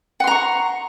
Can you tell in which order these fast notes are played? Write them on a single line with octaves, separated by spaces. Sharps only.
F#5 C6 A#5 C#6